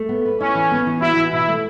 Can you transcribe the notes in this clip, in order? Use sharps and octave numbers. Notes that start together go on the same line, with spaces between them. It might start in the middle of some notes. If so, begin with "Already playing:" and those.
Already playing: A3
B3
B4
C#4 E4
E3
B3
E3
E4 F#4
E3
B2 E4
A3